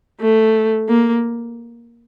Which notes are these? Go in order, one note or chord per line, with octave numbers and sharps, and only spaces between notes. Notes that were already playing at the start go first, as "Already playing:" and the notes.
A3
A#3